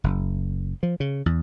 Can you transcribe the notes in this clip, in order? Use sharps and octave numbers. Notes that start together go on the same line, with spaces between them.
F#1
F3
C#3
E2